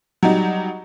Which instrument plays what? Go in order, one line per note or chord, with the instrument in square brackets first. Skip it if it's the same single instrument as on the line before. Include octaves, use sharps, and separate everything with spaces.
[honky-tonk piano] F#3 G3 D#4